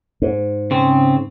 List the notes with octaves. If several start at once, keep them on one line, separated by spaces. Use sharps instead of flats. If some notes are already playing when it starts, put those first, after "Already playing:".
G#2
C#3 C4